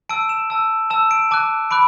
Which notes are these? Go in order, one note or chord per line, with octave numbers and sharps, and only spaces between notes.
A5 E6 D7
E7
A5 E6
A5 E6 E7
D7
A5 D6 F#6
B5 D6 F#6 D7